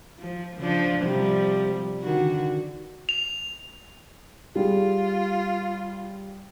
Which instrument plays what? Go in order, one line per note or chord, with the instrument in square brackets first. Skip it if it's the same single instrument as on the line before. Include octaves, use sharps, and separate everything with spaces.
[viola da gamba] F3
C#3 F3 D4
C3 F3 G3
D3 D#3 F#4
[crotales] F7
[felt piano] G3 G#4 [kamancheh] F4